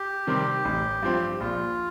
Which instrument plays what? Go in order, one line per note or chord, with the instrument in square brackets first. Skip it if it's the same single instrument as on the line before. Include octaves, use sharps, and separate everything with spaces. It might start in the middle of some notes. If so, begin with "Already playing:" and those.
Already playing: [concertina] G4
[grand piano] C3 D#3 G3 C4
A1
G2 F3 C4
[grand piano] A#1 [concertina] F4